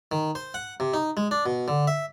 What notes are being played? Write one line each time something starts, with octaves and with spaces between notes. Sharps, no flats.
D#3
C5
F#5
C3
D#4
G#3
D4
B2
D3
E5